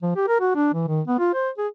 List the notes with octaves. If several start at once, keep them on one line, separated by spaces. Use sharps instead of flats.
F3
G4
A#4
F#4
D4
E3
D#3
B3
F4
C5
G#4